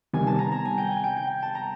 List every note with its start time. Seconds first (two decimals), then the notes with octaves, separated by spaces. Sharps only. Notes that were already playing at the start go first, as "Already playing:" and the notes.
0.13 C3 D#3 G3 B3 G#5
0.27 A5
0.39 A#5
0.52 A#5
0.65 G#5
0.78 G5
0.91 G#5
1.04 G5
1.17 G5
1.42 A5
1.55 A#5